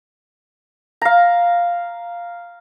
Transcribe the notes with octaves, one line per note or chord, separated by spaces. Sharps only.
F5 A#5